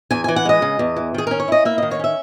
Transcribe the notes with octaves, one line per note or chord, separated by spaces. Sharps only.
E2 G#5
E3 G#5
F#5
G#3 D#5
C#3
E2
E3
D#3 G#4
C#4 A#4
C#5
E4 D#5
A#3 E5
D#3 D#5
C#5
C#4 E5